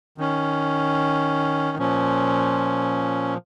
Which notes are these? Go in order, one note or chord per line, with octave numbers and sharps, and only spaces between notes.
D#3 C#4
A#2 F3 C#4